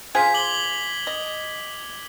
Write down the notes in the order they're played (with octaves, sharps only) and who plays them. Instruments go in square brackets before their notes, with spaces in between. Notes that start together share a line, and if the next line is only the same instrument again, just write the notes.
[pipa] F4 G#4 C5 [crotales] G#6 B6
[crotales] D6 F#7 G7
[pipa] D#5